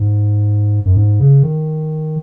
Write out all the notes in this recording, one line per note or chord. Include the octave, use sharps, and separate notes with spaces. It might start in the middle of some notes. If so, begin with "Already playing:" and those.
Already playing: G#2
F#2
G#2
C#3
D#3